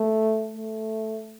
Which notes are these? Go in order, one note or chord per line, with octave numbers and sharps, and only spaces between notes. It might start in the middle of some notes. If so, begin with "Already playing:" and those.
Already playing: A3
A3